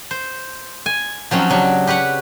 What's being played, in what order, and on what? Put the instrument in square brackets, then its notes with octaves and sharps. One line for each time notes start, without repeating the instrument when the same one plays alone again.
[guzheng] C5
G#5
F3 F#3 C4 C#4 D#4
C#3 F#3 D4 G4
G4 B4 C#5 F#5